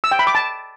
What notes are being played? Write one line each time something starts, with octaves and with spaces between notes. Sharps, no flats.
E6
G5
B5
D6
A5